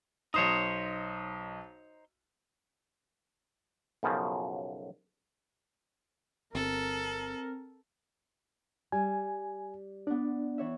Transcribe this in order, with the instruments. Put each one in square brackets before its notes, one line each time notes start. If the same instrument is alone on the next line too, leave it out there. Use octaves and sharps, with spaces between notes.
[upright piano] B1 D#6 [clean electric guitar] D#4 C5 C#5
[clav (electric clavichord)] B1 F#2 C#3 F3
[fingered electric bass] G1 [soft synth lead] C4 [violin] A4 [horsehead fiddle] A#4
[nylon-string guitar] G3 [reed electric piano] G#5
[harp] B3 D5 [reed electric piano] D4
[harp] E3 C#5 E5